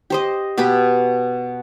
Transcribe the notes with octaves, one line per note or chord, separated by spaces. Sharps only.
G4 C5 D#5
B2 G4 B4 B5